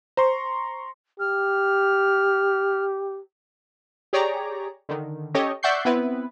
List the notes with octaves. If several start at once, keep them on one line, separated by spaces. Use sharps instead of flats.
C5 A#5 C6 C#6
G4 F6
G4 G#4 C#5 D5 A#5
D3 D#3
C#4 G4 A4 C#5 D#5
D5 E5 F#5 C#6 G6 C7
B3 C4 E4 B4